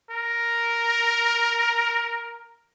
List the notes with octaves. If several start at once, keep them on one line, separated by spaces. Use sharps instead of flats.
A#4